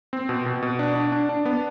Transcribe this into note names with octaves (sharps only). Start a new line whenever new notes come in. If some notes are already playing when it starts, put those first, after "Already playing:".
C4
B2
B2
B2
D4
D4
D4
D4
B3